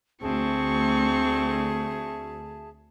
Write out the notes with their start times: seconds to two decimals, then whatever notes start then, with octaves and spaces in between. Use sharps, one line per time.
0.22 D2 A3 C4 G#4 E5 A5 C#6